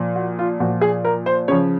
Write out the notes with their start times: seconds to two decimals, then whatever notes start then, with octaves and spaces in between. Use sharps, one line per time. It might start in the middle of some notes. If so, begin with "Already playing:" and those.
Already playing: A#2 F3
0.16 F#4
0.39 F4
0.60 A#2 F3 F#4
0.81 G#4
1.05 A#4
1.26 C5
1.48 C#3 F3 C#5